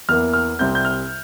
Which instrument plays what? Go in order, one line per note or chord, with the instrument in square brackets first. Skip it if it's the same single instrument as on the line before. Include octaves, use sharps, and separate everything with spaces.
[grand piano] E2 E3 A#3 F6
F6
C2 C3 G3 C4 G6
G6
F6